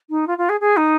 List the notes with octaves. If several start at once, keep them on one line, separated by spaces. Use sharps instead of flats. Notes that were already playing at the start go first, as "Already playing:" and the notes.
D#4
F4
F4
G#4
G#4
D#4